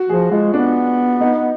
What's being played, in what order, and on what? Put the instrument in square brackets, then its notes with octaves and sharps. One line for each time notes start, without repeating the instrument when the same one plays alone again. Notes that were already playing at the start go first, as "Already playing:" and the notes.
Already playing: [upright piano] F#4
[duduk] F3 [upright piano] G#4
[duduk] G#3 [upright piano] F4
[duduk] B3 [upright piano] D4
[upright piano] D#4